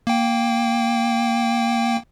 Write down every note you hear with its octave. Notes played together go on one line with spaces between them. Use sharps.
A#3 G5